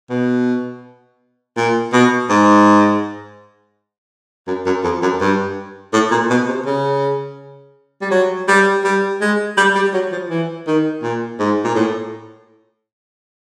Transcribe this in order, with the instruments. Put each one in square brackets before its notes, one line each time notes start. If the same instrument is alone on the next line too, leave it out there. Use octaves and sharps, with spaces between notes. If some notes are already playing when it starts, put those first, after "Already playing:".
[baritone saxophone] B2
A#2
B2
G#2
F#2
F#2
F2
F#2
G2
A2
A#2
B2
C3
C#3
G3
F#3
G3
G3
G#3
G3
G3
F#3
F3
E3
D#3
A#2
G#2
A#2
A2